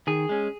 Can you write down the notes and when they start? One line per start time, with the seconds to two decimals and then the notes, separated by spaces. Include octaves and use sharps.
0.07 D#3 G#4
0.29 G#3 C#4